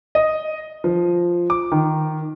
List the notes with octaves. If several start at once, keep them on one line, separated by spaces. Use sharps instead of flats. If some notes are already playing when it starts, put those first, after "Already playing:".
D#5
F3
D6
D#3